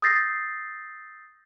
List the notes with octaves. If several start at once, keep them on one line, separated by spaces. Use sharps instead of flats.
D#6 E6 G6 A6 A#6 C7